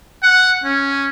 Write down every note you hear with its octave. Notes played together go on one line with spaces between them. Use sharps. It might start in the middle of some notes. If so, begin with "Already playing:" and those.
F#5
C#4